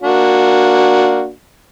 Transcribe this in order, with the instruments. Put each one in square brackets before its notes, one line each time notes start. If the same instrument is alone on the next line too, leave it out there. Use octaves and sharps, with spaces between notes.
[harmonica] A#3 D4 F#4